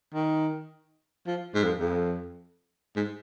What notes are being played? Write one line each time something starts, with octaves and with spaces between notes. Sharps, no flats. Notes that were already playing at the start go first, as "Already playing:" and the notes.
D#3
F3
G#2
F2
F2
G#2